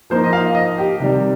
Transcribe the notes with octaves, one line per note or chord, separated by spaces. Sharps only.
F3 A#3 D#4 C5
D#5
F5
D#5
G4
C3 D#3 G3